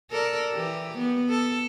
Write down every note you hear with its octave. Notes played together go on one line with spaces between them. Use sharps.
A4 A#4 D5
E3 G4
B3
A4